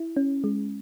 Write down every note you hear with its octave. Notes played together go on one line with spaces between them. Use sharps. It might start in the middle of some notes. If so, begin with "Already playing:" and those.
Already playing: E4
C#4
G#3